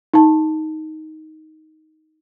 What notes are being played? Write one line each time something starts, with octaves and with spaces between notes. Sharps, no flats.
D#4 A5